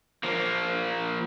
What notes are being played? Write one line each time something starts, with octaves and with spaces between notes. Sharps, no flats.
F3 A#3